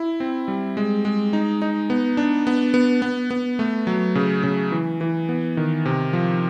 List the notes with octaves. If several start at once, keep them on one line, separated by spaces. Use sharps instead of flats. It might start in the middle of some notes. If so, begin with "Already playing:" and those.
Already playing: E4
C4
G3
G#3
G#3
D#4
D#4
B3
D4
B3
B3
B3
B3
A3
F#3
C#3
C#3
E3
E3
B3
D#3
C3
F3